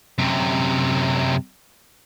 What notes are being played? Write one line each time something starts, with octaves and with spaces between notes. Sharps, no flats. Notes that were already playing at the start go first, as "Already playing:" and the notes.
F#2 C3